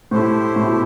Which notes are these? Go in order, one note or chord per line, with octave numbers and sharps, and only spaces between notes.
A2 A3 E4 G4 C5
A2
B2